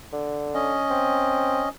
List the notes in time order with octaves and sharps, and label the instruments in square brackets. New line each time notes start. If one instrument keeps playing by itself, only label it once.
[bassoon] D3
[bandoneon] C#4 D#5
[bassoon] C4